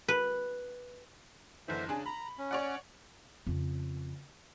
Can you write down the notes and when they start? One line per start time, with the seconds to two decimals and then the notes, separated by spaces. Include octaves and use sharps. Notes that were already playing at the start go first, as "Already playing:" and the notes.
0.08 B4
1.68 F#1 D3 E3 C5 E5
1.89 C#3 D4 G#4
2.06 A#5 B5
2.38 C#4
2.51 C#5 D5 F#5
3.47 F2 C#3